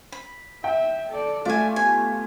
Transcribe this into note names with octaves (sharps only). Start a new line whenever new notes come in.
B5
E5 G5
A4 D5
A3 F4 F#4 D5 E5 G#5
B3 G4 G#5